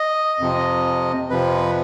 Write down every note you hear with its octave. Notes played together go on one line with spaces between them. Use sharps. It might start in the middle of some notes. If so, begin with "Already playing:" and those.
Already playing: D#5
F2 C3 F3
F2 C3 F3 B4